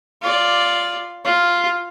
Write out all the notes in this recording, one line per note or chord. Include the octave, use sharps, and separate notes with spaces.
F4 D5
F4